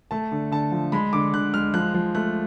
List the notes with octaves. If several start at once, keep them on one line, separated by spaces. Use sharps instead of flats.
A3 A5
D3
D3 A5
F3
G#3 B5
D3 D6
D3 F#6
G#3 F6
F3 F#6
F3
A3 F#6